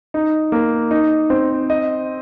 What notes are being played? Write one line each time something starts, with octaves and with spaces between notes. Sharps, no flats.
D#4
A#3
D#4
C4
D#5